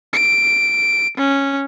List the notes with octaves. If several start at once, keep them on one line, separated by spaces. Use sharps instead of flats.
D7
C#4